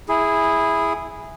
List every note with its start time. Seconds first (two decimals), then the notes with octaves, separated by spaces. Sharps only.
0.09 E4 G#4